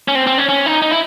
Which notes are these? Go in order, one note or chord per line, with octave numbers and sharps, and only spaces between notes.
C#4
C4
C4
C#4
C#4
D#4
D#4
E4